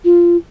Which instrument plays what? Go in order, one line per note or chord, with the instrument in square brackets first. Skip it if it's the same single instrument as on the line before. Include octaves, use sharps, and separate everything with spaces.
[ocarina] F4